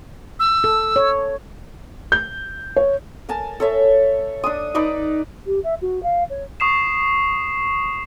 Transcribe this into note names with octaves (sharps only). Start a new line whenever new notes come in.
E6
A4
C#5
G6
C#5
A#4 G#5 A5
A4 C#5 E5
D4 D#6
D#4 B4 D5 A#5
G4
E5
F#4
F5
C#5
C#6 D#6 C7 E7